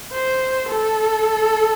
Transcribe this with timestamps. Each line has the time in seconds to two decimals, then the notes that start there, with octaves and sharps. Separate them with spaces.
0.13 C5
0.69 A4